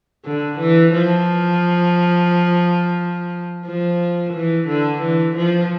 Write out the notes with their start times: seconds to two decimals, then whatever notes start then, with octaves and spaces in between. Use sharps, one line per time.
0.25 D3
0.59 E3
0.94 F3
3.65 F3
4.33 E3
4.68 D3
5.02 E3
5.36 F3